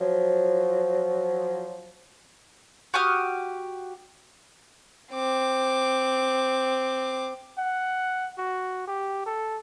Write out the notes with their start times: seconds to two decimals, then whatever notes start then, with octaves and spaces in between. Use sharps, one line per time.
0.01 F3 F#3
2.94 F#4 G4 D#6 F6
5.13 C4 D6
7.58 F#5
8.38 F#4
8.88 G4
9.26 A4